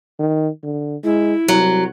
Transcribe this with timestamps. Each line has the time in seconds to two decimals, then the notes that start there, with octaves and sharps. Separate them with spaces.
0.19 D#3
0.63 D3
1.04 G#3 E4
1.48 C2 F#3